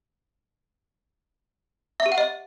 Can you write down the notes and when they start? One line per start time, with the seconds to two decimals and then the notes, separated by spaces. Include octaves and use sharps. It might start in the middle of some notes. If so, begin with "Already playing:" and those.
2.00 E5
2.06 G4
2.12 F#5
2.18 D#5